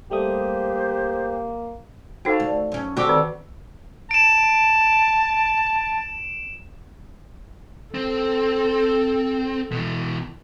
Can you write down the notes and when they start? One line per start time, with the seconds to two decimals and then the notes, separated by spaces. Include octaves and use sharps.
0.11 G3 A3 A#3 G4 C5 D#6
2.25 D#4 F#4 A4 C5 F5 G5
2.40 D2
2.72 F#2 C#4
2.97 D3 C4 F#4 G4 D6
3.09 D#3
4.11 A5 D7 E7
7.95 C4 A4
9.72 B2 E3